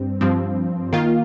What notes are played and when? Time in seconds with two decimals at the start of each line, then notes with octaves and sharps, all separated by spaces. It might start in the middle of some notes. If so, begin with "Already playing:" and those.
Already playing: G2 C4
0.21 G2 F3 C4
0.93 D#3 A#3 F4